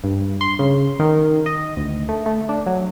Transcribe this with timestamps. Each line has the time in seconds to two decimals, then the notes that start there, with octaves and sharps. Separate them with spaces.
0.04 G2
0.41 C6
0.59 C#3
0.99 D#3
1.46 D#5
1.77 D2
2.09 A3
2.26 A3
2.49 D4
2.66 F#3